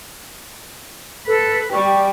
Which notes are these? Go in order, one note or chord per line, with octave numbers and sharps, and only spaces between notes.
A4 B4
G3 G4 C#6